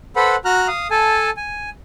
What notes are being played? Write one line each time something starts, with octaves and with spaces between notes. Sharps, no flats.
A4 B4 C5 F#5 B5
F#4 A#5 F6 F#6
F5 D#6
A4 G#5 A5
G#5